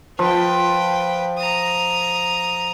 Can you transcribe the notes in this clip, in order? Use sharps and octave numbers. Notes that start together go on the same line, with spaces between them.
F3 B4 G5
A#5 D#6